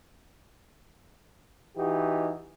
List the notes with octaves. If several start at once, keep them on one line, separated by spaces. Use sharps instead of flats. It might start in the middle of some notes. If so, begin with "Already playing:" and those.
E3 D#4 F#4 G4